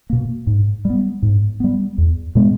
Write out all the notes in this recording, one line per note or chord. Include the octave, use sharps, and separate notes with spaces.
B2 A#3
G#2
G3
B3
G#2
G3 B3
E2
B2 G#3 B3